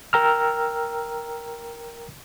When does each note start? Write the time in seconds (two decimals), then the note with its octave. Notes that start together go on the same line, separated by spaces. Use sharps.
0.13 A#4 G5 A#5 E6 F6